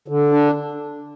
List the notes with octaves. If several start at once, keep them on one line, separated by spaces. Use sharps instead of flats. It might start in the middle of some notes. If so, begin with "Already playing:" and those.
D3
D4